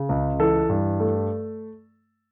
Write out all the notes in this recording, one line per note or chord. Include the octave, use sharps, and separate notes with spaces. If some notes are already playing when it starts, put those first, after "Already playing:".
Already playing: C#3
C#2
E3 A4
G2
A3